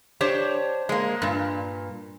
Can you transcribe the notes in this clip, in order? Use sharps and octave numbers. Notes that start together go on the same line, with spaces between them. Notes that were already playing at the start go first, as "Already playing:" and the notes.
D4 G4 C5 C#5
G#3 A#3
G2 A#2